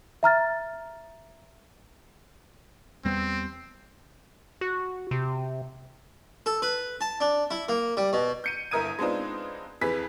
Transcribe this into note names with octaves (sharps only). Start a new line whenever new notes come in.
E5 A#5 F6 A6
E2 G3 B3 C4
F#4
C3
A4
B4
A5
D4
E4
A#3
G3
B2
G6 C#7 D#7
G1 E4 A#4 D#6 G#6 D#7
G#3 B3 C4 D4 D#4 F4
F2 E3 G#4 B4 B6